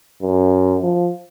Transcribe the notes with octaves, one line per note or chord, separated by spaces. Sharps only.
F#2
F3